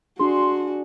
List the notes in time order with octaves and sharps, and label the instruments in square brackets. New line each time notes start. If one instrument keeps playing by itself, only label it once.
[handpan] D4 G#4 [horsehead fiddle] F#4 [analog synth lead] C6